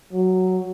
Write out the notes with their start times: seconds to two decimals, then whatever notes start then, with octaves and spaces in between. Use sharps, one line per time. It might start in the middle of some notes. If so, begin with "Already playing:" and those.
0.13 F#3